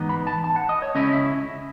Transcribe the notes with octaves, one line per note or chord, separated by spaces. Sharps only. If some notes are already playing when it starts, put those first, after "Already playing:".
Already playing: G#2 E3 B3 D#4
B5
A5
A5
F#5
D#5
C#5
C#2 C#3 G#3 C#4 E4 D#5
E5